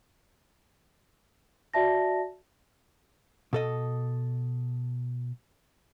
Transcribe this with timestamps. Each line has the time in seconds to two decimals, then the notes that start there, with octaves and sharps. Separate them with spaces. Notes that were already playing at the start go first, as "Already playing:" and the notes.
1.74 F#4 D5 E5 A5 A#6
3.53 B2 A4 D#5